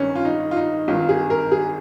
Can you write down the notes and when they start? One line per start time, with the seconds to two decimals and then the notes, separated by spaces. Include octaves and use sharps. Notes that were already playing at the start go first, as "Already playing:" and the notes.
Already playing: G#1 G2 D#3 C#4
0.15 F4
0.25 D#4
0.51 F4
0.56 D#4
0.88 G#1 G2 D#3 F4
1.09 G#4
1.30 A#4
1.52 G#4